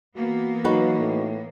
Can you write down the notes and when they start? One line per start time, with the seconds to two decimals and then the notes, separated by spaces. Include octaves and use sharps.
0.15 E3 A#3 B3 F#4
0.64 F#3 D#4 F#4 B4
0.98 A2